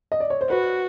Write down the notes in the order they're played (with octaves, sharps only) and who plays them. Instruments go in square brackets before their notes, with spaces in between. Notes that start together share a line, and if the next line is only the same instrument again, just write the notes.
[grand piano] D#5
D5
C#5
C5
[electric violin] F#4 [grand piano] B4